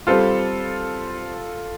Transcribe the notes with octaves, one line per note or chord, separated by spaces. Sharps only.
G3 C4 F4 G4 A4 C5